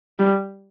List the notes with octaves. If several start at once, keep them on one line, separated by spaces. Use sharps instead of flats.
G3